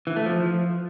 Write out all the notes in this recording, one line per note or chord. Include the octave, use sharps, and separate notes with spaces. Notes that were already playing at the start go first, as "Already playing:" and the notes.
E3
A3
F3